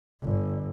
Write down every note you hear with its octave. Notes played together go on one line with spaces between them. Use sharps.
G1